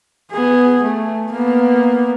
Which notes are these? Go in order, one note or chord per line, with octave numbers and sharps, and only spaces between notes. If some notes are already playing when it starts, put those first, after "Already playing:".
B3 G#4
A3
A#3 B3